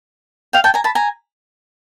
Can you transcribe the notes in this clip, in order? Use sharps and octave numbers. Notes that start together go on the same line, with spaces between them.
F5 G5
G5 A5
G#5 A#5
A5 B5
G#5 A#5